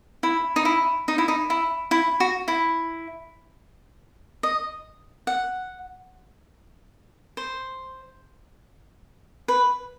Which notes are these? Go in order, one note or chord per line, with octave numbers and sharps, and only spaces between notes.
E4
D#4
E4
D#4
E4
D#4
E4
E4
F#4
E4
D#5
F#5
C5
B4